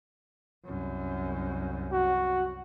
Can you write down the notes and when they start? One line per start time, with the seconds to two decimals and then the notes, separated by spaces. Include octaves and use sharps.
0.65 C2 F#2
1.92 F#4